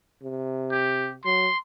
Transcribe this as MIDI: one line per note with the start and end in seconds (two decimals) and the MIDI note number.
0.23 1.17 48
0.72 1.12 67
1.25 1.48 54
1.25 1.57 84